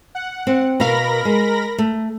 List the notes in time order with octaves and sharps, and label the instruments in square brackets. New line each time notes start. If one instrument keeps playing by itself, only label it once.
[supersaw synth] F#5
[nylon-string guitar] C4
[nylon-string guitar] B2 F5 [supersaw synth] A#4 B5 A#6
[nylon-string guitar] G#3
A3